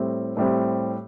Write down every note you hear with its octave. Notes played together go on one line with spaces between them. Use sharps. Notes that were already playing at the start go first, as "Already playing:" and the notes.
Already playing: A2 G3 C4
A2 G3 C4